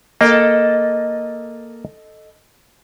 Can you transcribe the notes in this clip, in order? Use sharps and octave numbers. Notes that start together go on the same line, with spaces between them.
A#3 A4 D#5 G5